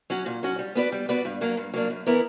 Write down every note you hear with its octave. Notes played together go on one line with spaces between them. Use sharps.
F#3 C#4 F#4
A#2
F#3 C#4 F#4
G3
B3 F#4 B4 D5
G3
B3 F#4 B4 D5
G2
F#3 A#3 D4
G2
F#3 A#3 D4
F#2
E3 B3 E4 A#4